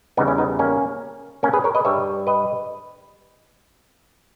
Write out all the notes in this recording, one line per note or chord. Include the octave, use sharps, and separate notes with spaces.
E2 C#3 G3 B3 D#4
C#4 E4
B3 D#4
A#3 C#4
A#3 C#4
G#4 B4
A#4 C#5
B4 D#5
G2 G3 C#5 E5
B4 D#5